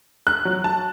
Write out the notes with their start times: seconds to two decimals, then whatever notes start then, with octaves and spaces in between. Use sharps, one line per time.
0.27 F#6
0.45 F#3
0.64 A5